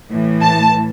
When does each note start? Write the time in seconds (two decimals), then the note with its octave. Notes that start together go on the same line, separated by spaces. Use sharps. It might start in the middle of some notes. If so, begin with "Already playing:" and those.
0.10 A2 E3
0.42 A5